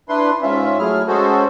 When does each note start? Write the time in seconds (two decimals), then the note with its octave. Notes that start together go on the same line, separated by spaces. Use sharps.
0.09 D4 E4 B4 C6
0.42 G#2 C#4 F4 E5
0.79 F#3 A3 E4 G#4 F6
1.07 G#3 C#4 F#4 G#4 A4 C5